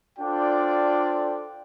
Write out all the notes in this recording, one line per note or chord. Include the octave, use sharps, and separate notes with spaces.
D4 F4 A4 C5 D5 G5